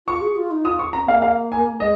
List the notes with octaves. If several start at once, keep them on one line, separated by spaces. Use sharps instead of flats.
F4 C#6
G#4
F4
D#4
F4 D#6
C#6
C#4 A#5
A#3 F5
F5
G#5
G#3 D#5